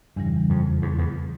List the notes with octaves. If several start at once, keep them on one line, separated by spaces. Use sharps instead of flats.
E2 G2 C#3 E3 G3
F2
E2
E2